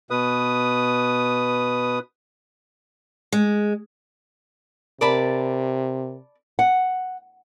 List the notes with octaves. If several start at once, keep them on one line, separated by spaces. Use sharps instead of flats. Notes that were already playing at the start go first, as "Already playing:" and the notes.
B2 B4 D#6
G#3
C3 A#4 D5 A5 B5
F#5